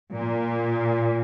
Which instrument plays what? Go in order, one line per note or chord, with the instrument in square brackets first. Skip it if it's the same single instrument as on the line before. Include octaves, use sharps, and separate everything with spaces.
[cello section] A#2